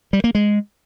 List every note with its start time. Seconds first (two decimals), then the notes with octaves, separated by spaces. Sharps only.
0.13 G3
0.24 A#3
0.35 G#3